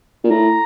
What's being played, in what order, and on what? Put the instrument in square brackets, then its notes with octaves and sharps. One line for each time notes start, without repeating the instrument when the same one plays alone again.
[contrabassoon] A#2
[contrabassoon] A2 [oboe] A#5